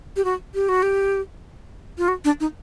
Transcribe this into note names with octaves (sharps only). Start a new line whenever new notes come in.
G4
F#4
G4
F#4
G4
F4
F#4
D4
D#4